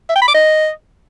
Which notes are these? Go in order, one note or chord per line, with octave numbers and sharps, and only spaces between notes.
E5
G5
B5
D6
D#5